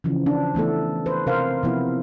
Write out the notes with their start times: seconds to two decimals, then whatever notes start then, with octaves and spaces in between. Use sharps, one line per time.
0.04 C#3 E3 F3
0.26 D4
0.55 E3 A3 B3 A4
1.06 B4 C5
1.26 C3 A#4 C5 F5
1.63 C3 F3 B3 E4